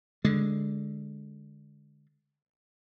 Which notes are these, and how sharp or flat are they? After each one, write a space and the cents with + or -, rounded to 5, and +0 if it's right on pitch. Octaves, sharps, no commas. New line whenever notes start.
D3 -5 G#3 +0